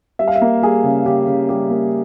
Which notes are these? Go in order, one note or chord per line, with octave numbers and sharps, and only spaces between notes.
G3 E5
F5
E5
A#3
G3 G#4
C#3
C#3 G4
C#3
G3 G4
A#3